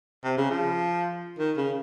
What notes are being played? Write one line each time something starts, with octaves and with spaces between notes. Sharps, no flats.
C3
C#3
F3
D#3
C#3